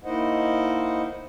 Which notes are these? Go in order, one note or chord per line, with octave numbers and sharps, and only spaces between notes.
A#3 D#4 E4 C5 D#5 F#5